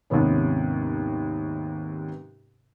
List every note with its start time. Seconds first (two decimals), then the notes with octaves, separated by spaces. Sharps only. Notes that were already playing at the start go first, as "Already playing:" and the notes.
0.10 D#2 G#2 C3 B3 C#4